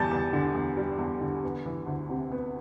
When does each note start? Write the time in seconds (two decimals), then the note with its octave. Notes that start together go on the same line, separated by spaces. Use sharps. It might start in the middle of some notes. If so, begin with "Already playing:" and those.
Already playing: E2 G3 A5 G6 A6
0.11 E2
0.33 D3
0.55 E2
0.77 G3
0.99 E2
1.21 D3
1.43 B3
1.66 E3
1.86 D2
2.09 C3
2.32 B3